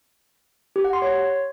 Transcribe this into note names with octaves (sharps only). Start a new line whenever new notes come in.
G4
F#5
C6
C#5